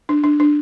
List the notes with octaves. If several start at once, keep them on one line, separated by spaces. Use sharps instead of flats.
D4
D4
D4